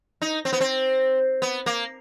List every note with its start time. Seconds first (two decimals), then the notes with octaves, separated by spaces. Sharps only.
0.22 D#4
0.45 C4
0.53 B3
0.60 C4
1.42 B3
1.66 A#3